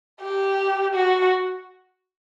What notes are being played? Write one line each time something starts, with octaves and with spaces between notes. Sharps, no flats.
G4
F#4